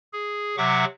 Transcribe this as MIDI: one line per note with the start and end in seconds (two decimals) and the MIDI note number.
0.13 0.56 68
0.57 0.85 48
0.57 0.85 54
0.57 0.85 76
0.57 0.85 78
0.57 0.85 85
0.57 0.85 86